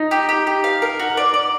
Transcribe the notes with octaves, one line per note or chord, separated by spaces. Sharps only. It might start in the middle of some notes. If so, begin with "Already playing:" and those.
Already playing: D#4
G4
G4
G4
F5
A#4
F#4
D5
D5